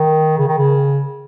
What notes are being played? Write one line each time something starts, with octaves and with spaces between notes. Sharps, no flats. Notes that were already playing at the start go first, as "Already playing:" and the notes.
Already playing: D#3
C#3
D#3
C#3